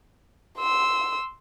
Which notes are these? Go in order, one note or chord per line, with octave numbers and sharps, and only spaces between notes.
C6 E6